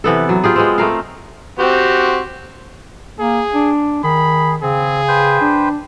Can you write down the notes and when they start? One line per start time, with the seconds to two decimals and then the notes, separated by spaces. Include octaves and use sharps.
0.04 C3 E3 B3 A4
0.29 F#3
0.44 F4 G4 G#4
0.56 G#3 B3 C4
0.78 A3 A#4 F5
1.59 C4 F#4 G4
3.19 A#3 G#4
3.54 D4
4.03 D#3 G#4 B5
4.62 C#3 C4 G#4
5.08 B4 C5 G5
5.41 D4